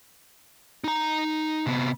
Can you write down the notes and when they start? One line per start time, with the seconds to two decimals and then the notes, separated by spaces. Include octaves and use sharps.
0.84 D#4 A#5
1.66 C3 B3